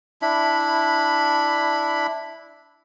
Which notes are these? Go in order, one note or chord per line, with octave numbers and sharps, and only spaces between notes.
D4 E4 B5